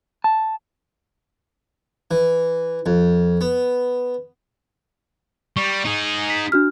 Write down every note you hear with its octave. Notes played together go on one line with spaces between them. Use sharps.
A5
E3
F2
B3
G3 C#6
D#4 G#4
B6
D4 F#4 F6